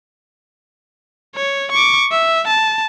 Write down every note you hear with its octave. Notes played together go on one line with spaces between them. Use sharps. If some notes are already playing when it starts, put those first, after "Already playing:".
C#5
C#6 D6
E5
A5